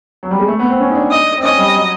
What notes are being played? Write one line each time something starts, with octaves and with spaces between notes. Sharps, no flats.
F#3
G3
G#3
A3
B3
C4
C#4
D#4
D4
D#5
C4
C#4 D#5
G3
F#3